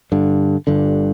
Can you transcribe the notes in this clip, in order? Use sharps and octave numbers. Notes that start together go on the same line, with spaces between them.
G1 G2 D3
G1 G2 D3